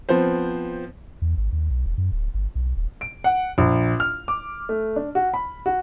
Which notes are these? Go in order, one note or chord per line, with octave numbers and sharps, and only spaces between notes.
F3 B3 C4 C5
E2
G#1
D#2
B1
E1
F#2
D1
G1
B1
D#1
D7
F#5
A#1
F6
D6
A3
D4
F#4
B5
F#4